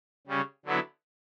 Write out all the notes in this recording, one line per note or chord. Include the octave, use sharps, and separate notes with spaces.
C#3 G3 C#4
D3 F#3 B3 E4